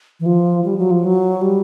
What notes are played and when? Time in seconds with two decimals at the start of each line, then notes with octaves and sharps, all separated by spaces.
0.20 E3
0.26 F3
0.65 G3
0.78 F#3
0.91 F3
1.05 F#3
1.41 G3